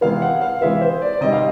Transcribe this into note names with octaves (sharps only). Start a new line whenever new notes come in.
C3 E3 G#3 B3 F5
F#5
F5
C3 E3 G#3 B3 E5
C5
D5
D5
C3 D#3 G3 D#5
F5